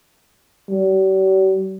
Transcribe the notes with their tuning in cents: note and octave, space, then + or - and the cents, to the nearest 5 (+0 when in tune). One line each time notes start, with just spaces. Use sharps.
G3 -45